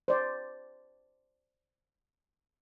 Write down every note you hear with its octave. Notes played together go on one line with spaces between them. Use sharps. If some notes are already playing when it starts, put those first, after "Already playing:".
C5 D5